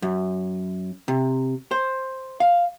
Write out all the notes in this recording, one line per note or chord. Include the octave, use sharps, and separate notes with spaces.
F#2
C3
C5
F5